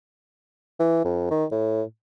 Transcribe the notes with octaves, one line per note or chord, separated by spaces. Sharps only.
E3
F2
D#3
A2